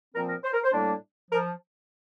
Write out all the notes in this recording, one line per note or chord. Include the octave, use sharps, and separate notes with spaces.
A#2 F3 C4 A#4
A#4
C5
A#4
C5
A2 G3 A#3 D4
F3 A#4